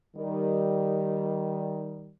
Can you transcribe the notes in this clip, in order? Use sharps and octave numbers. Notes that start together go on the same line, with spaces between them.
D#3 G3